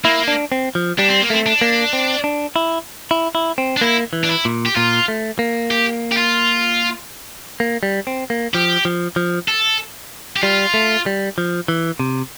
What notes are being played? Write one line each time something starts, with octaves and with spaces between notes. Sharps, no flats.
A#3 E4
D4
C4
F3
G3 D4
C4
A#3
A3 C4
D4
A#3
C4
D4
E4
E4
E4
C4
D4
A#3 E4
E3
D4
E4
A#2
G4
A#2 F4
A3
A#3
G4
G4
F4
A#3
G3
C4
A#3
F3 G4
F3
F3
A4
G4
G3 F4
A3
G3
F3
E3
C3